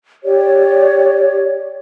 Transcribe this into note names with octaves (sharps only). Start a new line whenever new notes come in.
G4 C#5 D5